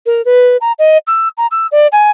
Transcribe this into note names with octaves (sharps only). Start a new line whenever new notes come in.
A#4
B4
A#5
D#5
E6
A#5
E6
D5
G#5